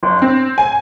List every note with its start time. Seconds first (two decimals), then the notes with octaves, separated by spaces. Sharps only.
0.03 F#1
0.22 C4
0.58 G#5